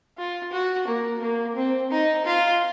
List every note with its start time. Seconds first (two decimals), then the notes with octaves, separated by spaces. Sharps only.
0.18 F4
0.52 F#4
0.87 A#3
1.22 A#3
1.56 C4
1.91 D#4
2.25 F4